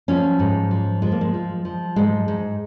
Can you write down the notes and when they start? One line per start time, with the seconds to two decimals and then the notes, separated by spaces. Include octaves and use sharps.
0.08 F3 C#4
0.39 G#2
0.71 F3
1.02 F3 G#3
1.12 A#3
1.21 G#3
1.34 F3
1.65 F3
1.96 G#2 G#3
2.28 G#2